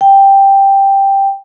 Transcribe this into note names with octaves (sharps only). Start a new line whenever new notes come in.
G5